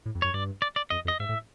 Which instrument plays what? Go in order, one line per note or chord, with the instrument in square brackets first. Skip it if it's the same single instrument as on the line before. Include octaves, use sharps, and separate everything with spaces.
[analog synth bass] A2
F2
[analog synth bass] F#2 [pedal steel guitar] C#5
[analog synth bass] G2 [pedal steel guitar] D5
[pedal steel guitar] D5
D5
[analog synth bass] F2 [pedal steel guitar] D#5
[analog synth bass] F2
[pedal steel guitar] D#5
[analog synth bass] G#2 [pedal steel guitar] E5
[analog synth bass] A2